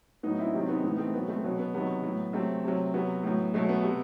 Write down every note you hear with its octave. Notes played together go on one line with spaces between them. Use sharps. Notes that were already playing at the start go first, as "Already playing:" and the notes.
A2 F#3 B3 D#4
C4 E4
C3 D#3 F#3 C4
B3 D#4
A2 E3 B3 D#4
A3 C4
B2 F#3 B3
A3 C4
B2 F#3 B3
B3
C3 D#3 F#3 B3
A2 F#3
C3 F#3 A3 C4
C3 F#3
C3 F#3 B3
A2 F#3
B2 F#3 A3
B3
C3